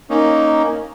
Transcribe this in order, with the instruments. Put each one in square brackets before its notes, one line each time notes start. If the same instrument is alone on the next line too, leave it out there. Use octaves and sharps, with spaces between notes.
[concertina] A#3 C#4 D#4